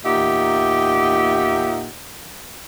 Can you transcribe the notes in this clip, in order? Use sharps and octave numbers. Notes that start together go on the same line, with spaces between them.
E2 A#2 D#4 G4 E5 F#5